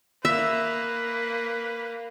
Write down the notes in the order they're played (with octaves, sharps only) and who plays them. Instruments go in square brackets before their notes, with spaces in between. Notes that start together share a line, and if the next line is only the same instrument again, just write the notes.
[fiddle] A#3 [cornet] B4 [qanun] E5